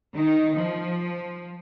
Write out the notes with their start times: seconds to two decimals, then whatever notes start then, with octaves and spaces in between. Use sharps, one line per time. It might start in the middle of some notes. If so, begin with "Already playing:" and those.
0.15 D#3 D#4
0.56 F3